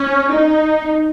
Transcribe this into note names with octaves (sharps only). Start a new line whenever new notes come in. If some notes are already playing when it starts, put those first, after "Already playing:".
Already playing: C#4
D#4